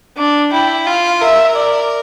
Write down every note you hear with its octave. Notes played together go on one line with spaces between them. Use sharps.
D4 D6
E4 G5
F4 F5
A#4 E5
D5